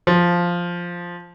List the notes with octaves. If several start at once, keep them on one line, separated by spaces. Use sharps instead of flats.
F3